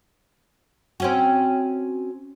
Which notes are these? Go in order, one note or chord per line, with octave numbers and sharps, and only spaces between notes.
C4 C#4 F#4